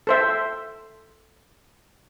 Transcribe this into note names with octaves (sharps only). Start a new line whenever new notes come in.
A4 C5 E5